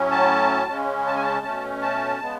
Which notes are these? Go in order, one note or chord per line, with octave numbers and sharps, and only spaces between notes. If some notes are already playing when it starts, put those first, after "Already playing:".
Already playing: A2 F#3 C#4
A5
C#3 G#3 C#4
A5
G#5
A5
B2 A3 C#4
A5
C#3 G#3 B3